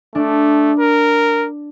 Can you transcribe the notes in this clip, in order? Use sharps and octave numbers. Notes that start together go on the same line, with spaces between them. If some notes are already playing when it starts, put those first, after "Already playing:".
A3 D4
A#4